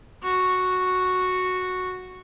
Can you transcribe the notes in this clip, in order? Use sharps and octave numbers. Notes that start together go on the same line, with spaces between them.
F#4